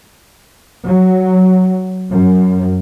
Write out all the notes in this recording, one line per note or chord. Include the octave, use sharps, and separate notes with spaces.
F#3
F#2